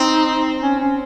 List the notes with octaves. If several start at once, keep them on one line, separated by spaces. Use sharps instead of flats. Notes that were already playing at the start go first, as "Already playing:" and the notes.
Already playing: C4 D#4
C#4
C#4